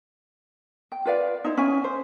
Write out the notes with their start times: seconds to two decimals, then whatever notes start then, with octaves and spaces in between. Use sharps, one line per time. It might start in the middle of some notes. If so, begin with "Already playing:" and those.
0.92 G5
1.05 F4 B4 D5 F5
1.44 D#4 E4 C5
1.57 C#4 G#5
1.84 C5